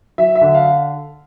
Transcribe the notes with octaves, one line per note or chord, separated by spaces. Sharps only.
F#3 E5
E5
D3
F5